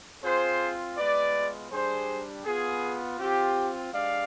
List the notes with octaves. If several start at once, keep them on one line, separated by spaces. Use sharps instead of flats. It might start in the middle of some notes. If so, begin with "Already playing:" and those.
C4 F4 G#4 C5
G#3 B3 F4 B4 D5
G3 D4 G4 G#4 C5
B3 F4 G#4
C4 F4 G4
G#3 D4 G4 D5 F5